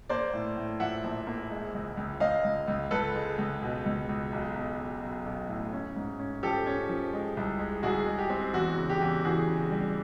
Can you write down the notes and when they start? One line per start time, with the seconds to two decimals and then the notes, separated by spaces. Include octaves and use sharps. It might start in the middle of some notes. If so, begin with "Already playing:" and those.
0.09 A#3 C5 D5
0.33 A2
0.57 A2
0.80 F3 E5 F#5
1.04 A#1
1.27 A#3
1.50 G#3
1.74 C#2
1.97 C#2
2.20 C#2 D#5 F5
2.44 C#2
2.67 C#2
2.91 C#2 A4 B4
3.15 G#3
3.38 C#2
3.62 B2
3.86 C#2
4.09 C#2
4.32 B1
4.55 B1
4.79 B1
5.02 B1
5.25 B1
5.48 A2
5.73 C#4
5.96 G#2
6.19 C#4
6.43 F3 G4 A4
6.66 C#4
6.89 F3
7.13 G#3
7.37 C2
7.59 G#3
7.83 C2 F#4 G#4
8.06 G#3
8.18 G4
8.30 C4
8.54 E2 F#4
8.77 C#3
8.90 G4
9.01 E2
9.24 E3 F#4 G#4
9.47 C#3
9.71 G3